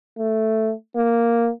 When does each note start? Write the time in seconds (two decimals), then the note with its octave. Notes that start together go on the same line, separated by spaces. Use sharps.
0.18 A3
0.96 A#3